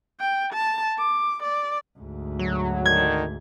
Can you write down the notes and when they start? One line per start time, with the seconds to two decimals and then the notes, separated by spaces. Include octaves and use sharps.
0.20 G5
0.53 A5
0.98 D6
1.43 D5
1.99 D2 G#2
2.39 F#3
2.86 D3 D#3 G#6